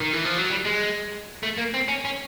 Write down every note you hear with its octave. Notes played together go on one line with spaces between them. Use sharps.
D#3
E3
F3
F#3
G3
G#3
A3
A#3
C4
C#4
C#4